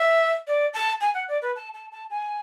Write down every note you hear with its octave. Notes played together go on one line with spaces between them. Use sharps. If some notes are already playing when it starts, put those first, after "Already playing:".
Already playing: E5
D5
A5
G#5
F#5
D5
B4
A5
A5
A5
G#5